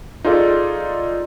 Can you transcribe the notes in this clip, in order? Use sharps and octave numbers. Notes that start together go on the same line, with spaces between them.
D#4 F4 G#4 A4 D5